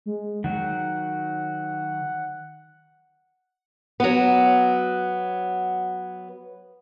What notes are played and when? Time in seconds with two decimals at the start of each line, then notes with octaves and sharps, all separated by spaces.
0.06 G#3
0.44 D#3 F#3 F#5
4.00 F#3 B3